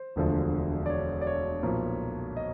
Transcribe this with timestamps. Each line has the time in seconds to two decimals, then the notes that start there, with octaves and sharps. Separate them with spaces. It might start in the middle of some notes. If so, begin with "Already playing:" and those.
Already playing: C5
0.16 E1 D2 D3 F3
0.86 D5
0.90 C#5
1.21 D5
1.27 C#5
1.63 B1 A#2 F3
2.37 D#5